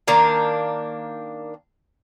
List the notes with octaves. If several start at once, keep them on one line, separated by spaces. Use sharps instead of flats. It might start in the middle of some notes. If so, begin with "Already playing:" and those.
D#3 A#3 D4 A#5